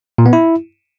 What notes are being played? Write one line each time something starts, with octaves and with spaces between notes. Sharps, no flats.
A#2
B3
E4